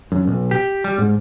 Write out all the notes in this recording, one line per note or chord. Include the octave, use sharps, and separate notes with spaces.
F#2
B1
G4
G3
G#2